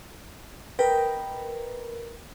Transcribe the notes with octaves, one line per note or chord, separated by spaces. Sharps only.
A#4 B4 D#5 G5 B5